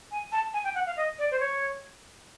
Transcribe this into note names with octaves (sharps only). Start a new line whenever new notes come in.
G#5
A5
G#5
G5
F#5
F5
D#5
D5
C5
C#5